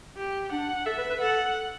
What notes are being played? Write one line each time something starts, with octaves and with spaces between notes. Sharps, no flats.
G4
D4 F#5
A4 E5
B4
B4
A4 F#5